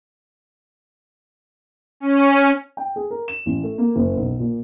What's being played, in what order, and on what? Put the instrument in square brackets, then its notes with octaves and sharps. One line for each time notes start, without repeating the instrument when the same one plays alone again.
[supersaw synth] C#4
[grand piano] G5
G#4
A#4
E7
A1
A3
A#3
F#1
B1
A#2